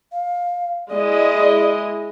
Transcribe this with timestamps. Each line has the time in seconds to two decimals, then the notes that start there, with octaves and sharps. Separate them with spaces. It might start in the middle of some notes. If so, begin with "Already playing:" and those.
0.12 F5
0.90 G#3 E4 D5 D#5